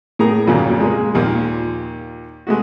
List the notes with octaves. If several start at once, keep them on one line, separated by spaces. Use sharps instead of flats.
A2 G#4 A#4 A#5
G#1 F2 A#2 C#3 F#3
A#2 G#3 A#3
D#2 A#2 F3
G#3 A3 F#4